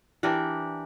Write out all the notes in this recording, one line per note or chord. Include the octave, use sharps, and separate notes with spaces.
E3 D4 G4 A#4